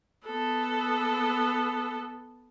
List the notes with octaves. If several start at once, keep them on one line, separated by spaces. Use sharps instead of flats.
B3 A4